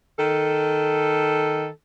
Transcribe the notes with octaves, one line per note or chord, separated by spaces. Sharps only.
D#3 A4